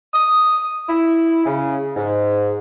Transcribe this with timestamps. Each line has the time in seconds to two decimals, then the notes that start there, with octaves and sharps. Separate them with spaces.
0.14 D#6
0.89 E4
1.46 C#3
1.96 G#2